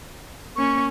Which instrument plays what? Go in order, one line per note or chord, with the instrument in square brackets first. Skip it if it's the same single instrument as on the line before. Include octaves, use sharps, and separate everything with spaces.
[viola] A#3 C#4 [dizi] C#6